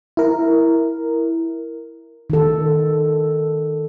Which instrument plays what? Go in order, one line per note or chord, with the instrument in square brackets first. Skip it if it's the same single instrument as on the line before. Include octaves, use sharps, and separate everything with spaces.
[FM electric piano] E4 A#4
[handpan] D#3 A4